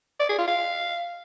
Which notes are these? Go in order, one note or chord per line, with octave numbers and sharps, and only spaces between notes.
D5
G#4
F4
F5